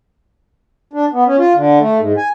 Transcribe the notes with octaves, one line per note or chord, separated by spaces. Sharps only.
D4
B3
C#4
F4
D3
A3
G#2
G#5